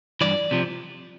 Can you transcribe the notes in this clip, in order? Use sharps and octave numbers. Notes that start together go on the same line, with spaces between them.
G2 E3 D5
C3 F3